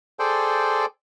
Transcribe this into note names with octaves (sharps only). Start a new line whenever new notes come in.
G#4 A4 C5 D5 G5